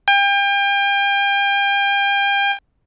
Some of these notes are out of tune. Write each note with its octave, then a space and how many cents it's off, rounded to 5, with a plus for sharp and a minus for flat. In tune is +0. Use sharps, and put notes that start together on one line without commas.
G5 +35